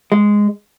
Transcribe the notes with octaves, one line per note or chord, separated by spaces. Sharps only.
G#3